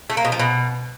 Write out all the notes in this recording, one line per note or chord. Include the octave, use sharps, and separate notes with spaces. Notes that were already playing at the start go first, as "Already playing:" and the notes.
A3
A#3
B2
F3
B2